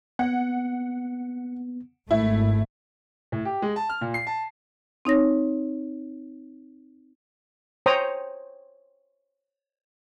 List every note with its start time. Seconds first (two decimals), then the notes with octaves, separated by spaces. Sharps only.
0.19 B3 F#5
2.11 G#1 A3 E4
3.32 A2
3.45 G4
3.62 G#3
3.76 A5
3.90 F6
4.01 A#2
4.14 C7
4.27 A5
5.05 C4 D#4 C#5 A#6
7.86 C5 C#5 G5 A#5 D#6